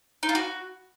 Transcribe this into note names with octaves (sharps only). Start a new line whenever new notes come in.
D#4
F4
F#4